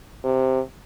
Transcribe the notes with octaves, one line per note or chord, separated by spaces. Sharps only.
C3